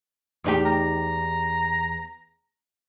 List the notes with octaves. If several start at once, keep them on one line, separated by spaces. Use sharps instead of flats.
E2 D#4 G4
A#5